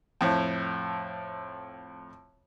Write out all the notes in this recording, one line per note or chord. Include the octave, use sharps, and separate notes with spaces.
F2 A2